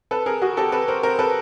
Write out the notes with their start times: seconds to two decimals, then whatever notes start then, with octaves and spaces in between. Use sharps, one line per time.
0.11 A4 B4
0.26 G#4 A#4
0.42 F#4 G#4
0.57 G4 A4
0.72 A4 B4
0.88 A#4 C5
1.03 A#4 C5
1.19 A4 B4